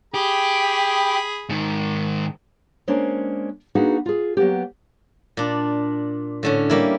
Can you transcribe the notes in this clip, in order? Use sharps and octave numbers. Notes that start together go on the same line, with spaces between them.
G4 G#4 B5
G#2 D#3
G#3 A#3 C#4 D4 C5
A#3 D4 D#4 F#4 G#4 B4
F4 G#4
F#3 A#3 B3 G4
A#2 D4
A2 D3 C#4
G3 A#3 E4